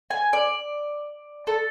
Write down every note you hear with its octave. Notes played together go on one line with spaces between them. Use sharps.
G#5
D5
A4